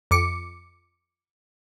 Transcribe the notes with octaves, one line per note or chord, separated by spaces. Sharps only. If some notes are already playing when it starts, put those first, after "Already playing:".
F2 D6 C#7